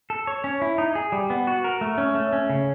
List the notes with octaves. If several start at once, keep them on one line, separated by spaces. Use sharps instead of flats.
A4
C#5
C#4
E4
D#4
G#4
G3
B3
F#4
A#4
A3
C#4
A3
C#4
C#3